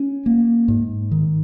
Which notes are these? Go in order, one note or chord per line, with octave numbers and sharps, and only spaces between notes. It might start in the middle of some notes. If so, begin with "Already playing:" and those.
Already playing: C#4
A#3
G#2
D#3